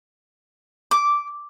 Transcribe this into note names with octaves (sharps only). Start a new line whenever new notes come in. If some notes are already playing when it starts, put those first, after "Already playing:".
D6